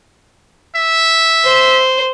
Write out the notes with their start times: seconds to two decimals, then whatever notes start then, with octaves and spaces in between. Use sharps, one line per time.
0.76 E5
1.44 C5